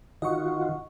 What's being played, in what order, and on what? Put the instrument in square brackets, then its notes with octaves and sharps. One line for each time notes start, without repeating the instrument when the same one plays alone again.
[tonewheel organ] D#3 F4 F#4 [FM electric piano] D#5 F#5 C#6